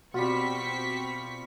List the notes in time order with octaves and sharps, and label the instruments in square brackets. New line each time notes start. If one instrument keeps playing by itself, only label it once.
[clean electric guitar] B2 [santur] G3 F4 [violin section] C4 C#6 B6 [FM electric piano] F#4